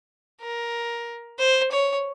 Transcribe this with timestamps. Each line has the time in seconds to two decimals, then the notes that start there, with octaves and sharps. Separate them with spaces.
0.41 A#4
1.38 C5
1.71 C#5